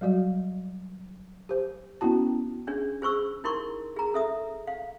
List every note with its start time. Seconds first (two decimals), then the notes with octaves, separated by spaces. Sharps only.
0.01 F#3 G3 F#4 D5
1.49 G4 C5
2.01 B3 C#4 E4 F#4 A5
2.67 C#4 D4 G#4 C#5
3.02 G#4 C5 C#6 E6
3.44 D#4 E4 A#4 C6 C#6
3.96 G#4 A#5
4.14 A4 E5 D#6
4.67 F5